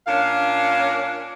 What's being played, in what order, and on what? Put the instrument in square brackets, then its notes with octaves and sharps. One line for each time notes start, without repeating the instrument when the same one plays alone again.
[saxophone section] A#2 C#4 D4 [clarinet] F5